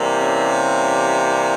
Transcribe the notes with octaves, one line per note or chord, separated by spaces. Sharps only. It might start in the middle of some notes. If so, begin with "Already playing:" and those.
Already playing: C3 E3 G3 A#3
C#4